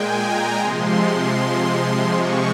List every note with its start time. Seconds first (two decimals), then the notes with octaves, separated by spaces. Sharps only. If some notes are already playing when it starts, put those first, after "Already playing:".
Already playing: A#2 G#3 G5 G#5
0.21 A#5
0.59 C3 F3 G#3 C6
2.14 C3 F3 G#3 C#6